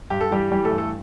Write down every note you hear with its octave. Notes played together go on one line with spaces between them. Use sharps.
G2 G4
A4
E3 G3 G4
E3 G3 G4
A3 A4
G2
A3 A4